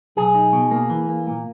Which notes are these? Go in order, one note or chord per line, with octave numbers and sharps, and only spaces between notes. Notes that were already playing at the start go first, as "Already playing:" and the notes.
B1 G#4
D#4
B2
A#3
E3
A#3
A#2